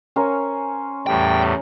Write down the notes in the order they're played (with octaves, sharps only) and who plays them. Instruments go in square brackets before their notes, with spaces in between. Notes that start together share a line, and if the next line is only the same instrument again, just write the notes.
[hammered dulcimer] C#4 G#5 [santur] A#4 C5 F5
[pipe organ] E2 A2 G3 [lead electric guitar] G5